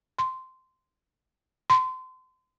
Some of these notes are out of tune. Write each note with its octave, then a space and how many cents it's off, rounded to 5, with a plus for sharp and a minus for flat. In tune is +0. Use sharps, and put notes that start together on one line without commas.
C6 -10
C6 -30